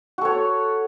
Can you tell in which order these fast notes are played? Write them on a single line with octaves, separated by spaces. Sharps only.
F#4 A4 C#5